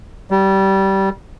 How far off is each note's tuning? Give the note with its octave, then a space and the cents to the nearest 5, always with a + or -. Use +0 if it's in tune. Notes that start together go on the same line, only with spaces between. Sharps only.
G3 -20